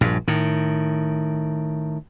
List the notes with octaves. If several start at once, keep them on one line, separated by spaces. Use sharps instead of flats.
A#1 G2
A2 D#3